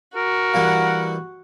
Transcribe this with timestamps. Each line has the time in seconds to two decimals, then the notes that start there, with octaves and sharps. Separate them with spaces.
0.16 F#4 A#4
0.54 E3 G3 A#3 F#5